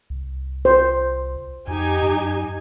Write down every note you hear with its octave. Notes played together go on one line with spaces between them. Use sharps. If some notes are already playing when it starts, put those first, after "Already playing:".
C2
C5
F2 D#4 G4 G#5
F#2